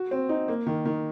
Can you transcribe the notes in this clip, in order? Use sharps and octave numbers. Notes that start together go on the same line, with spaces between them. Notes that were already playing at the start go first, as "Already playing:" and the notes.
Already playing: F#4
C4
D#4
A#3
D#3
D#3